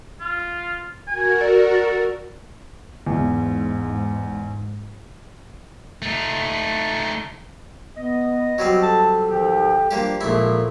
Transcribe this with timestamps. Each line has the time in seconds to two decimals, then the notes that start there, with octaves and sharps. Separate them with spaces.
0.21 F4
1.07 F#4 A#4 G#5
1.41 A4 D5
1.76 A4
3.06 E2 G#2
6.02 A3 D#4
7.97 B3 D#5
8.58 F#3 G3 C4 F#4
8.83 A4 A5
9.30 G#2 D#3 F3 G4
9.91 F3 G3 A#3 D4 G4
10.21 A#1 A#2 F3 G#3 E4 A4